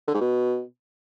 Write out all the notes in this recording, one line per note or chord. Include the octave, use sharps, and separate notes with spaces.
D3
G#2
B2